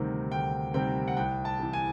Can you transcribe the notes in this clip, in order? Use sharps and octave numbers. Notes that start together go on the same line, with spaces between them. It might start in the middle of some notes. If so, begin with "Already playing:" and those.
Already playing: D2 C3 D#3 G3 C4
D2 G5
C3 D#3 G3 C4 G5
F#5
C2 G5
A5
C3 E3
G#5